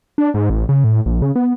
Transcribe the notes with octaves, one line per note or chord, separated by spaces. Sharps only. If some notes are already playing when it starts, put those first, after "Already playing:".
D4
G#2
A1
C#3
A2
A#1
C#3
B3